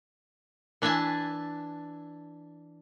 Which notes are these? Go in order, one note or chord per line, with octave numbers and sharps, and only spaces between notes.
E3 D4 E5 G#5 A5